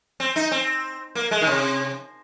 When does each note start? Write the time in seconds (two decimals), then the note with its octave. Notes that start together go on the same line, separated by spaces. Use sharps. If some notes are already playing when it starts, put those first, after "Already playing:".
0.20 C4
0.36 D#4
0.51 C4
1.15 A#3
1.31 G#3
1.41 D#3
1.47 C3